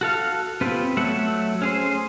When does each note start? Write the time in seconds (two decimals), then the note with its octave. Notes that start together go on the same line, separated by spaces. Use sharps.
0.01 F#4 A4 F5
0.61 B3 C4 F4 G4 B4
0.97 F#3 A3 E5 F#5
1.62 C#4 G#4 C5